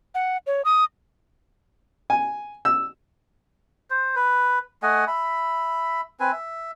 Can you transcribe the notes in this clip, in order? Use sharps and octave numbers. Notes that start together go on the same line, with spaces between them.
F#5
C#5
D#6
G#5
E6
C5
B4
A3 D#5 F#5 G#5
E5 B5
C4 B4 G#5
E5